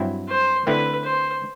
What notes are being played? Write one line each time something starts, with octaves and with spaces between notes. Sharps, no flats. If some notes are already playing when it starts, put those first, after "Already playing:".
Already playing: G2 F#3 C4 E4
C5
D3 A3 C4 E4 B4
C5